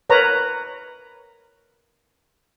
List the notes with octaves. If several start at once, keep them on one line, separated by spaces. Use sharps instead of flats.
A#4 B4 C#5 A#5